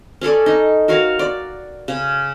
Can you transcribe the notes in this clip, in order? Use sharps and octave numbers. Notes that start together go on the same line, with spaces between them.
C#4 G#4 A4 D5
D#4
F#4 A#4 C#5 F5
D5
C#3